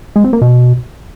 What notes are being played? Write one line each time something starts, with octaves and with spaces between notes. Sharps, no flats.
G#3
C4
A#3
B2